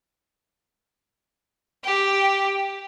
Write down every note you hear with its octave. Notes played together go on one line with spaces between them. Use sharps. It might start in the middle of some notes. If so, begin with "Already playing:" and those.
G4